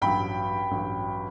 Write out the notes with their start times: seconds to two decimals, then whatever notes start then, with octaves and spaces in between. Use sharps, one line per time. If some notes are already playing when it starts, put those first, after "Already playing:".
0.01 A1 G2 F#3 G5 B5
0.71 A1 G2 F#3